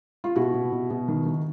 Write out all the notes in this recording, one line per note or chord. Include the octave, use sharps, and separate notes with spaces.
F4
B2 E4 F#4
B2
B2
B2
D#3
D#3